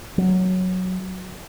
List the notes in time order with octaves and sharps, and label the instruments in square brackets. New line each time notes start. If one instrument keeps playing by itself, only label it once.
[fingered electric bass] F#3